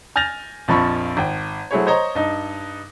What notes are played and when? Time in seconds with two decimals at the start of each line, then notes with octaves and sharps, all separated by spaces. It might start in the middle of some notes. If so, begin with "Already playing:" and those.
0.16 G#5 F6 G6 A6 A#6 F7
0.68 A#1 F2 F3 B5 C#6
1.17 G#1 G5
1.71 F#3 A3 E4 G#4 C5 C#5
1.87 C5 C#5 D#5 A#5 C#6
2.15 G2 D#4